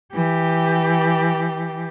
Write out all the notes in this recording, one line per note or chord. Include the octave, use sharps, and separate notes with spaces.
E3 G4